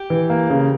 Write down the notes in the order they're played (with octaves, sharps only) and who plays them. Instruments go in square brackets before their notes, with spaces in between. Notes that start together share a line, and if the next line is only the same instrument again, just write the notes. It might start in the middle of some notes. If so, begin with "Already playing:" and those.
Already playing: [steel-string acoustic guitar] G4
[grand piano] E3
A#3
C#3